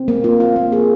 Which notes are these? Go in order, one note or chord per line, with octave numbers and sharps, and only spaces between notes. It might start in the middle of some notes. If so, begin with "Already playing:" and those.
Already playing: C4
A#3
F4
F4
A#3
G#4